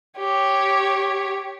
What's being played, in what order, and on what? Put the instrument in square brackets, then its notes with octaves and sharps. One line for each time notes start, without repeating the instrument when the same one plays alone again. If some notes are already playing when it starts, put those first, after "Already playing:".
[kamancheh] G4 C#5